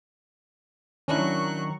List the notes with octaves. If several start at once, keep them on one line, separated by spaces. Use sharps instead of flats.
D#3 F#3 C#4 D4 E4 A#5 C#6 F#6